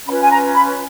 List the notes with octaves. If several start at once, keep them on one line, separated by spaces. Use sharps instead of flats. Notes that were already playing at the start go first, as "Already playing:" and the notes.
C#4 F4 B4 B5
G#5
A#5
B5